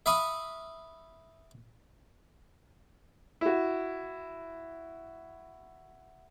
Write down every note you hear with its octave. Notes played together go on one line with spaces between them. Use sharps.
E5 F5 B5 C#6 D#6
E4 F#4